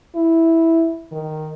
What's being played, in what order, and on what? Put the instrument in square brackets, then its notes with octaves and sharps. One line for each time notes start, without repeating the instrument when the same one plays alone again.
[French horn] E4
D#3